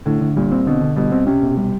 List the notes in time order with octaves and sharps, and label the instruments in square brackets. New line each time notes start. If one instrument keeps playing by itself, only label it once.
[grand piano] A2 [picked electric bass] D3
[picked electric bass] D3
[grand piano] A#2 [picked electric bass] G3
[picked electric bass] C4
[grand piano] B2 [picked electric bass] D3
[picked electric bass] D3
[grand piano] B2 [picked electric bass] G3
[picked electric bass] C4
[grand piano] C3 [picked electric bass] C#4
[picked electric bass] B2
G3